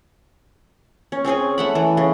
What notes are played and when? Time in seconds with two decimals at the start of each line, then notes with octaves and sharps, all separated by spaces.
1.12 C#4
1.25 C4 C#4 G#4 G#5
1.58 A3 F#5 B5
1.75 E3
1.97 C#3